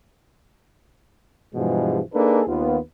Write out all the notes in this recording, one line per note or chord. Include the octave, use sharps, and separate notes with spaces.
G2 B2 E3 F3 G#3
A#3 D4 D#4 G#4 A4 B4
D#2 B3 F4